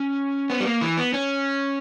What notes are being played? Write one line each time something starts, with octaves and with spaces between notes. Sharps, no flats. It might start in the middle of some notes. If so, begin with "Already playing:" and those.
Already playing: C#4
B3
G3
A#3
E3
B3
C#4